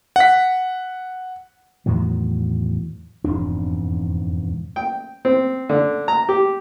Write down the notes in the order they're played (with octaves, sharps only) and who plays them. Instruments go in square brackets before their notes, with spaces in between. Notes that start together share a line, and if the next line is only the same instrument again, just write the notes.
[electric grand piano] F#5 B6
[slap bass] E2 A2 D#3 F#3
E1 F2 G#2 D4
[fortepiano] G5
C4
D3
A#5
G4